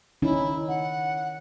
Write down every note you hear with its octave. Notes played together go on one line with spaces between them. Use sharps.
D#3 C#4 D#4 E4
F#5